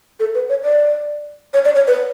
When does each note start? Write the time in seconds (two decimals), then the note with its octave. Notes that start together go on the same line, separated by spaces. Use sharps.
0.20 A4
0.35 B4
0.49 C#5
0.64 D5
1.54 C#5
1.65 D5
1.76 C#5
1.87 B4